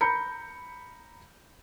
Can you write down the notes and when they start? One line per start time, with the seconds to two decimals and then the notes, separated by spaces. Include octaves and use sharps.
0.01 A#5 B5 G6 C#7